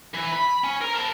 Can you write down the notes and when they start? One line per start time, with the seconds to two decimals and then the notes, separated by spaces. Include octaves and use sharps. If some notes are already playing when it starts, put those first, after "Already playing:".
0.14 E3
0.32 B5
0.64 C#4
0.82 A#4
0.94 A#4 A5